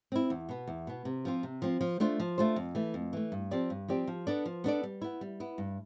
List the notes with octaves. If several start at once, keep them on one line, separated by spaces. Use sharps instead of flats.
C4 E4
E2
B2 B3
E2
B2 B3
C3
F3 C4 F4
C3
F3 C4 F4
F3
A3 D4 F4 C5
F3
A3 D4 F4 C5
F2
E3 A3
F2
E3 A3
G2
F3 C4 G4 D5
G2
F3 C4 G4 D5
F3
B3 D4 A4 D5
F3
B3 D4 A4 D5
G3
B3 E4
G3
B3 E4
G2